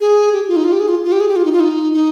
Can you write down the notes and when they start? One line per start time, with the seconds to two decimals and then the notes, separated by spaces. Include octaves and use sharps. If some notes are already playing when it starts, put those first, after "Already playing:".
0.01 G#4
0.33 G4
0.48 F4
0.56 D#4
0.64 F4
0.72 G4
0.80 G#4
0.88 F4
1.04 F4
1.12 G4
1.20 G#4
1.29 G4
1.36 F4
1.45 D#4
1.52 F4
1.60 D#4
1.93 D#4